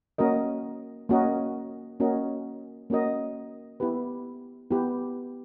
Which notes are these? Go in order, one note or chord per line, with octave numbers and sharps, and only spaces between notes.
A#3 C#4 F#4 A#4 D#5
A#3 C#4 F#4 A#4 D#5
A#3 C#4 F#4 A#4 D#5
A#3 C#4 F#4 A#4 D#5
B3 E4 G4 B4
B3 E4 G4 B4